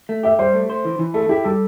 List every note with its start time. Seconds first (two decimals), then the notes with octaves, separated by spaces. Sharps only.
0.09 A3
0.23 G4 E5
0.39 G3 C5
0.54 A3
0.70 C5
0.85 E3
0.99 E3
1.14 A3 A4
1.29 E4 G4
1.44 G3 A4